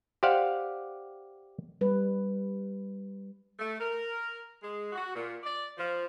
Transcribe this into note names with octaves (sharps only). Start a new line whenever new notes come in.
G4 C5 D5 F5 F#5
G3 B4
A3
A#4
G#3
F#4
A#2
D5
F3